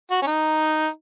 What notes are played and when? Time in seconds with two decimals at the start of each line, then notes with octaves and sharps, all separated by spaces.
0.11 F#4
0.22 C#4
0.27 D#4